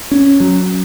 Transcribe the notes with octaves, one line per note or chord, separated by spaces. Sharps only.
C#4
F#3